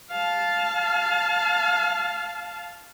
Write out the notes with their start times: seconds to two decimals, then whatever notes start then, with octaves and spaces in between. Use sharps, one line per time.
0.11 F5 A5